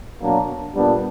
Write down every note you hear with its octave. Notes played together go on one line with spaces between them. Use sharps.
B2 F#3 A#3 D4
A#2 G3 B3 D4